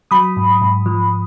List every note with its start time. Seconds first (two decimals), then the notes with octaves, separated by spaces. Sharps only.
0.11 F#3 B5 D#6
0.36 G#2
0.61 G#2
0.86 F3